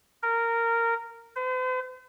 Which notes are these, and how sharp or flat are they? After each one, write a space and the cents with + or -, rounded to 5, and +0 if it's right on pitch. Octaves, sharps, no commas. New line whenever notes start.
A#4 -15
C5 -45